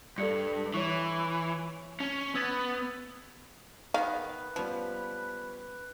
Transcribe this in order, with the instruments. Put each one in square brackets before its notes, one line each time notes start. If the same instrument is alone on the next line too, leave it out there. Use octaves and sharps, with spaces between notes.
[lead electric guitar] G2 [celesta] A4 D5 C#7
[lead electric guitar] E3 [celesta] C#5 C#6
[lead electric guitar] C#4
[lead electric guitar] B3 [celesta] E6 G#6 A6
[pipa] D#3 B3 [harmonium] B4 [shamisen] F5
[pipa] F3 [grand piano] G3 B3 C#4